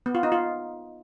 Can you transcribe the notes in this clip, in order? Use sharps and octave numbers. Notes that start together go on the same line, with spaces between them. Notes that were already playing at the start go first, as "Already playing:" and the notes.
B3
F4
D#4
F4